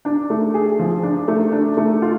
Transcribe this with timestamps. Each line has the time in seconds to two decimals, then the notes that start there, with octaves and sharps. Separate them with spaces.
0.05 D4
0.30 A3
0.54 G#4
0.79 F3
1.03 D4
1.28 A3
1.52 D4
1.77 A3
2.02 F4